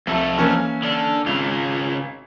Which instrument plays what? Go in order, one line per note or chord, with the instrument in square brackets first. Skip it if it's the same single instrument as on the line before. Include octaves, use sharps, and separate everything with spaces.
[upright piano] C2 [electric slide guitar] F2 A3 A4
[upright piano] E3 A#3 C#4
[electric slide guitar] D3 D4
[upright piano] G#1 [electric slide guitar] C#3 F4